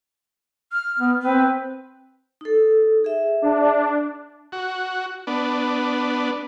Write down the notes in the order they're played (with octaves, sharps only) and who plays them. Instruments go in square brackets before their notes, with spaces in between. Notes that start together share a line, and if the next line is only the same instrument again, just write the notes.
[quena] F6
[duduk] B3
[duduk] C4 [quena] B4
[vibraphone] D#4 A4
G#4 E5
[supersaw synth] D4
[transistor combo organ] F#4
B3 D4